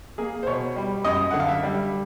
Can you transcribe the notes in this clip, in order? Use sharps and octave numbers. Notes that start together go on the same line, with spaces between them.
A#3 G#4
C5
B2 C#5
G3
F#2 D#5
D3 F#5
F5
E5
G3